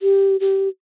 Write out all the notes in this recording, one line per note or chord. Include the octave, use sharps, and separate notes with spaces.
G4
G4